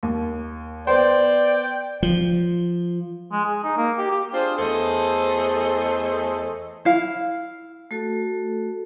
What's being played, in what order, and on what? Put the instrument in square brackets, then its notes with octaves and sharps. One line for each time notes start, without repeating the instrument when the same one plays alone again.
[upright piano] D#2
[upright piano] B3 C5 [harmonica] D5 [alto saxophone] G5
[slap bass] F3
[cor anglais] G#3
G#4
D#4
A#3
G4
G4
[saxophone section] D4 F4 G#4 C5
E2 A3 G#4 A4 C5 D#5
[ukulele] E4 F5
[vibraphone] A3 F#4 A4